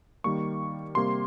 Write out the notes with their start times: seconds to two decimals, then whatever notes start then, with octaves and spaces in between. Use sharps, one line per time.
0.24 D#3 G3 A#3 C#6
0.95 C3 G3 A#3 C6